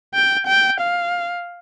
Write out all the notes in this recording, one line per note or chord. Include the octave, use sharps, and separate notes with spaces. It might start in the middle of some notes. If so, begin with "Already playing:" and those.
G5
G5
F5